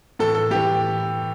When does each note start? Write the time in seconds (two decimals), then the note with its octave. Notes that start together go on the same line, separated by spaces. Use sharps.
0.19 A2 E3 A4
0.35 A4
0.51 A2 E3 G4